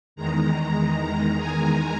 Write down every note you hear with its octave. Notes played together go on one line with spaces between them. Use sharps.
E2 D#3 G#3 A#5
A#5
A#5
G#5